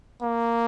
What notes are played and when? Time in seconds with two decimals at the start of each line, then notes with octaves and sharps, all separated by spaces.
0.22 A#3